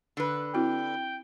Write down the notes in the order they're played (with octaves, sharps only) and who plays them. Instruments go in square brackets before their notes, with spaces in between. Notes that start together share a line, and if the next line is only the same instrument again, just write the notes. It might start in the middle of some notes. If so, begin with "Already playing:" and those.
[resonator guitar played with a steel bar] D3 B4
[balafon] C4 E4 F#4 [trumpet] G5